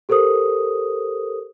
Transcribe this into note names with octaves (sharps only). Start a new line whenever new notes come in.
G4 A4 A#4 C5 D#6